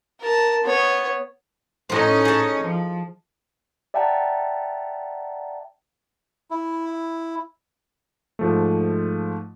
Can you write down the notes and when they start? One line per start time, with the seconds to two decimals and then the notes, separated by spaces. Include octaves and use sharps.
0.21 A#4 A5
0.64 B3 C#5
1.89 A2 C#4 D#4 C5 D#5
2.25 G#4 A5
2.63 F3
3.94 D5 E5 F#5 G5 A5 A#5
6.51 E4
8.39 G#2 F3 A3